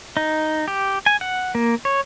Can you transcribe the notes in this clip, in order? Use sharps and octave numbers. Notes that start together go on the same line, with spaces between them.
D#4
G4
G#5
F#5
A#3
C#5